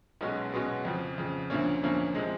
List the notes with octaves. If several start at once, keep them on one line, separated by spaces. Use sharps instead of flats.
B1 B2 G#3 C#4 F#4
B1 B2 G#3 C#4 F#4
F2 C#3 F3
F2 C#3 F3
D2 D3 F3 A#3 C#4
D2 D3 F3 A#3 C#4
C3 F3 G#3